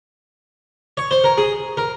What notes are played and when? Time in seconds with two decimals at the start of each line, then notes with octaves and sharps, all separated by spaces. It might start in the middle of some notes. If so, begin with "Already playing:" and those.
0.97 C#5
1.11 C5
1.24 A#4
1.38 G#4
1.77 A#4